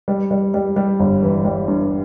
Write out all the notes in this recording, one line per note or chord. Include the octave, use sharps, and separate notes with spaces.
G3
G3
G3
G3
G1
E3
G3
G2